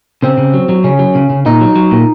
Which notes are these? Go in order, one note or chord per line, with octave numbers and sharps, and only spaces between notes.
C#3 C4
C#3
F#3
F#3
C#3 C#4
F#3
C#3
C#3
A#2 D#4
F#3
F#3
A#2